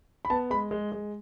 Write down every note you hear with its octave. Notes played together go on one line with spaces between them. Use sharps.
B5
B3 A5
G#3 B5
G#3
G#3